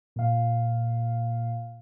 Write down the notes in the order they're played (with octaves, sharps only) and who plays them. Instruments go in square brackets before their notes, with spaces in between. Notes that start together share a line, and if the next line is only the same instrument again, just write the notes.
[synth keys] A#2 F5